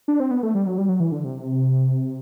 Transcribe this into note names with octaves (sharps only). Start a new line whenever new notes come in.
D4
C4
B3
A3
G3
F#3
G3
F#3
E3
D3
C3